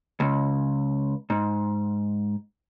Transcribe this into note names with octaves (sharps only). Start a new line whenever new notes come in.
C#2
G#2